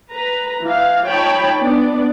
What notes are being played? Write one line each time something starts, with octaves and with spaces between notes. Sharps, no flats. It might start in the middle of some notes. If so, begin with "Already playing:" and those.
B4 A#5
E3 F5
F3 D#4 C#5 G5 A5 B5
B3 D4 D5